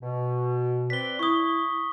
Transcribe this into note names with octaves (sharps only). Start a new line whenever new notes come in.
B2
C4 B4 D5 B6 G7
E4 C#6 D#6